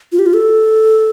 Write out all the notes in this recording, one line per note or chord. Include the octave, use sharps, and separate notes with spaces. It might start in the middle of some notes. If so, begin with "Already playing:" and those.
F4
G4
F4
A4